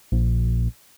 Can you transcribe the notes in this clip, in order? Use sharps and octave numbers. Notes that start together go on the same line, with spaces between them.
A#1